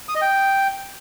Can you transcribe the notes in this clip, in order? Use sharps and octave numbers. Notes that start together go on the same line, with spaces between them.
D#6
D#5
G5